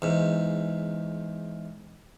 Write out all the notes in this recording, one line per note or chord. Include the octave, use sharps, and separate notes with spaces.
E2 G#2